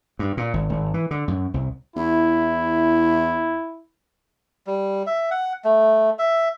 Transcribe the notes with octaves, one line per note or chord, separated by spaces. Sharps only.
G2
A#2
G#1
G#1
E3
D3
F#2
C2
E2 E4
G3
E5
F#5
A3
E5